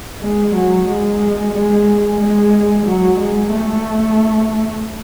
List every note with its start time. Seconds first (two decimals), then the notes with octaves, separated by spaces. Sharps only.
0.22 G#3
0.55 F#3
0.88 G#3
1.54 G#3
2.20 G#3
2.86 F#3
3.19 G#3
3.52 A3